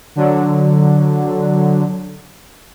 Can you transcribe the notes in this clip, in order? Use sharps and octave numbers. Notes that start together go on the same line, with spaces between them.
D3 F#3